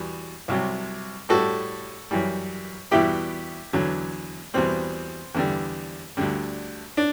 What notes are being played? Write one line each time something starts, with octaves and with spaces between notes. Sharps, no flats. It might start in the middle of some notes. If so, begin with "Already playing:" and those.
Already playing: E2 B2 G3
C2 C3 F#3
A2 G3 F#4 A4
F#2 E3 G3
E2 B2 G3 E4 G4
E2 D3 F#3
E2 B2 G3 C4
E2 D3 G3
D2 D3 G3
D4